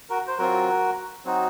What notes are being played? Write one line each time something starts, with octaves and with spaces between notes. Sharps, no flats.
F#4 A#4
C5
F#3 C4 F4 F#4 A#4
F#3 C4 D#4 F#4